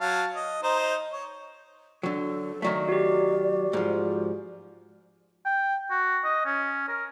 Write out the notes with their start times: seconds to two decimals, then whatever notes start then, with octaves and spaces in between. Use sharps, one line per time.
0.01 F#3 F5 A5
0.35 D#5
0.63 D#4 C5
1.12 C#5
2.03 D3 F#3 A4
2.62 D#3 F#3 A3 D5
2.89 F#4 G4
3.73 G#2 F3
5.46 G5
5.91 F#4
6.25 D#5
6.46 C#4
6.89 A#4